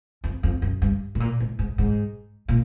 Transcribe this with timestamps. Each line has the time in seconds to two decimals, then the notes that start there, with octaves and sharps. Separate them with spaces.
0.24 F2
0.43 F2
0.62 F#2
0.82 G2
1.15 A2
1.20 A#2
1.40 A2
1.59 G#2
1.78 G#2
2.49 A#2